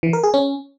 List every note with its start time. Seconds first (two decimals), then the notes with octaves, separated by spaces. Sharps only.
0.03 E3
0.13 A#4
0.23 G#4
0.34 C#4